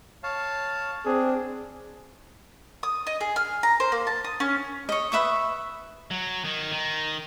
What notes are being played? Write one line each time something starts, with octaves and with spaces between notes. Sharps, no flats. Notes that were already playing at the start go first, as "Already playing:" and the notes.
C#5 F5 A5
C4 D4 G#4
D#6
D#5
G#4
F6
A#5
C5
A#3
A5
D#6
C#4
C#5 D#5
B4 E5 C#6 D#6
F#3
D#3
D#3